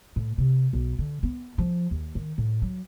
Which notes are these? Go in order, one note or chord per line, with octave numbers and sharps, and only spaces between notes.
A2
C3
B1
D3
B3
F3
D#2
D#3
A2
F#3